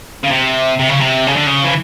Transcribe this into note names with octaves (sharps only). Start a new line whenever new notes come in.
C#3
C3
C3
C#3
C3
C#3
D3
C#3
E3